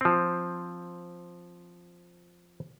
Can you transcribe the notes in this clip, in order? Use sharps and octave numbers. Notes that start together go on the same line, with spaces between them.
F3 C4